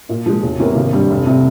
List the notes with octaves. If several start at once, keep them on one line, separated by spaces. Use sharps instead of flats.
A#2
F3 G#3
E1
E2 C3 E3 A#3
G#1
G2 G3
F1
C3